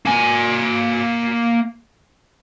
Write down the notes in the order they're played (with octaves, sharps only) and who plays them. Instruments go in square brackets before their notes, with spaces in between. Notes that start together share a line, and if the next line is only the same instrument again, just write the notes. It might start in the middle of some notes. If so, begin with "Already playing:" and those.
[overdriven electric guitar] A#3 G#5